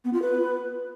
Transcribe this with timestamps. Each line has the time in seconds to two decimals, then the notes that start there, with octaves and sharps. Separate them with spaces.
0.05 B3
0.13 F4
0.22 B4